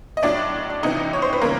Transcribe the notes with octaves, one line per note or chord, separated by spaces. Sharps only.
D#5
A2 F#3 D4 D5
C#2 C3 E3 D#4 D#5
C#5
C5
B4
C#3 E3 G3 A#3 A#4